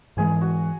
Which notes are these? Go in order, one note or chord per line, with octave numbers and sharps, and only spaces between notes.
G#2 E3 G#3 G#4
F#4